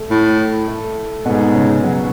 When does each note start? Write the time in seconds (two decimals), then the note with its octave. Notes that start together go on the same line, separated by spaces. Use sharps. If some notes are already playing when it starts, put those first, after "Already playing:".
Already playing: A3
0.10 A2
0.68 A3
1.25 G#2 B2 B3
1.55 C#3 C#4
1.84 F#3 F#4